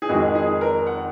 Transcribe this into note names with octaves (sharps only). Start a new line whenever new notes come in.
G#4
F2 D#3 G#3 F#4
G#4
A#4
F#5